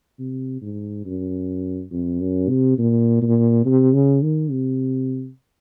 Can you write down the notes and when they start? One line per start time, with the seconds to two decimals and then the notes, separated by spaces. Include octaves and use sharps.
0.19 C3
0.62 G#2
1.06 F#2
1.92 F2
2.21 F#2
2.49 C3
2.79 A#2
3.22 A#2
3.65 C3
3.93 C#3
4.22 D#3
4.51 C3